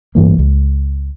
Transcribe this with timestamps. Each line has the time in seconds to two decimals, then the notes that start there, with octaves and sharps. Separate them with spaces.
0.15 A1 G2 E3 A#3
0.39 C#2